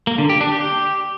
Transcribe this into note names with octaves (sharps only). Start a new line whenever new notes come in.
A#3
D3
G4
D4
G4